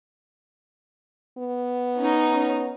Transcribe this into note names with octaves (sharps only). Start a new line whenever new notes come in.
B3
C#4 D#4